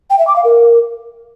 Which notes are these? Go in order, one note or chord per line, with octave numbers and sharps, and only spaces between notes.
G5
E5
D6
F5
A#4